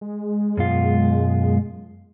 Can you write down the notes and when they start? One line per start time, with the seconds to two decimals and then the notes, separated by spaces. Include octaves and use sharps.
0.01 G#3
0.57 F#2 B2 F4